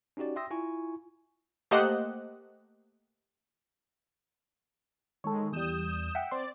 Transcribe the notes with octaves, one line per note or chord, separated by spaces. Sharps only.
C#4 D#4 F#4 G4 D5
E5 G5 C6 D#6 E6 A#6
E4 F4 G#5 C#6
A3 A#3 G4 C5 D#5 F#5
D#3 G#3 A4 C#5
E2 G3 D#6 G6 E7
E5 F#5 G5
C4 D5 C6